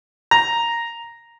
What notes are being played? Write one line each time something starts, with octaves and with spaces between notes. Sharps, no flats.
A#5